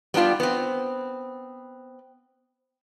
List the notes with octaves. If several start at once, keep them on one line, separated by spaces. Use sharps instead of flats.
G3 B3 D4 F4 G4
B3 C4